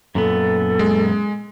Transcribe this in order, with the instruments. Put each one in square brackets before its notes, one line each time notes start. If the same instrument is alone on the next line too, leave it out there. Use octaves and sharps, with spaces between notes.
[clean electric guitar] F#2 A#2 B3 [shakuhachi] A4
[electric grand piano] G#3